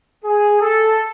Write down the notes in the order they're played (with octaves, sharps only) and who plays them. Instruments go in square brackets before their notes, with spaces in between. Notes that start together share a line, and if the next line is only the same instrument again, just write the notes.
[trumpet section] G#4
A4